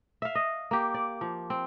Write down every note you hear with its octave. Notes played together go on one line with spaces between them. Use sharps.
E5 F5
D#5
A#3 G4
D5
F3
C4